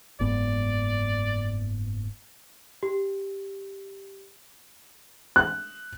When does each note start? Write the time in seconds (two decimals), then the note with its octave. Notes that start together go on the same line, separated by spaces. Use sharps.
0.20 F#1 G#2 B3 D5
2.83 G4
5.36 F#6